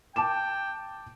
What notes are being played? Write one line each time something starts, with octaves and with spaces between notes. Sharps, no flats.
G5 A5 D6 E7